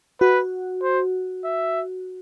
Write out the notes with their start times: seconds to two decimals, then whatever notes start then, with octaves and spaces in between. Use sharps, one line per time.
0.21 F#4 B4
0.82 C5
1.44 E5